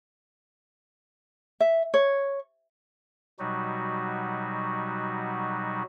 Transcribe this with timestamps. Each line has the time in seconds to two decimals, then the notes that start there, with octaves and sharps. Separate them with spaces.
1.60 E5
1.94 C#5
3.39 B2 F#3 G3 D#4 F#4